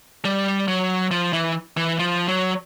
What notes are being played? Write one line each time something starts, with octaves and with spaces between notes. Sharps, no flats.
G3
F#3
F3
E3
E3
F3
F#3